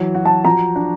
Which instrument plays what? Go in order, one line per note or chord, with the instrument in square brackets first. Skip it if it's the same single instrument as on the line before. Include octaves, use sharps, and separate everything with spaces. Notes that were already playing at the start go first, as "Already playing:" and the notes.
Already playing: [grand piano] E3 F#3
F#4
[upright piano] A5
[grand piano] F3 [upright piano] A#5
[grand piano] D4